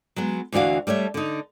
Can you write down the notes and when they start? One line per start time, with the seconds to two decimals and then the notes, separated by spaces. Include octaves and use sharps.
0.16 F#3 G#3 B3
0.52 D2 E3 D4 F#4 F5
0.87 G3 A3 C#5 E5
1.14 D3 D#4